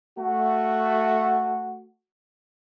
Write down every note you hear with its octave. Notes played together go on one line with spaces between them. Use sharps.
A3 F#4